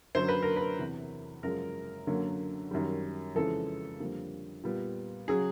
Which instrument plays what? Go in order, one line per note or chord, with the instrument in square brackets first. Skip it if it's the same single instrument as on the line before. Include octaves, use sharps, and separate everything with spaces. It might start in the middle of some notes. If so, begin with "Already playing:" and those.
[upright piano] F#2 D3 F#3 C5
B4
A#4
B4
E2 C3 E3
F#2 C#3 F3 G#3 A#4
F#2 D3 F#3 A#3
F#2 D#3 G3
F2 C#3 E3 G#3 A4
F2 D3 G3 A#3
A#2 G3 B3
C#3 F#3 G#4